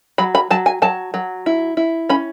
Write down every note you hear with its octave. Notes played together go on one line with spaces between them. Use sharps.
F#3 B5
B5
F#3 A5
G#5
F#3 A5
F#3
E4
E4
C#4 B5